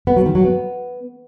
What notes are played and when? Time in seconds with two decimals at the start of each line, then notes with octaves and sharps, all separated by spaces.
0.07 B3
0.16 F#3
0.26 D#3
0.35 F#3
0.44 B3